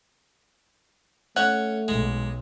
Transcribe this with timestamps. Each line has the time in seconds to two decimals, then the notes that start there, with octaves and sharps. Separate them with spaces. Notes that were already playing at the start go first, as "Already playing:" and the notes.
1.36 A3 C#4 F#5 C#6
1.88 B1 G#3